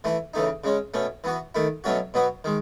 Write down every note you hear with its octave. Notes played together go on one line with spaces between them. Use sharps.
E3 A3 E4
C#3 E3 A3 D#4
C#3 G#3 C#4
B2 A3 C#4
E3 B3 F#4
D#3 A3 E4
B2 F#3 A3 C#4 F#4
B2 F#3 B3 F#4
D#3 G#3